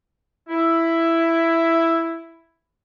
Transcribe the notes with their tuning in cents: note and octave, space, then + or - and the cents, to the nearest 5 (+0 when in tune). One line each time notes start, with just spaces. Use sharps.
E4 +5